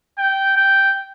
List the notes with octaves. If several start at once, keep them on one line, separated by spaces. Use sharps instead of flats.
G5
G5